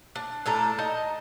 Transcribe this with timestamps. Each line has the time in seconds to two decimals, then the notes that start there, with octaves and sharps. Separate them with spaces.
0.16 D4
0.46 A2 D4 A4 A#5
0.78 D#4 D#5 A5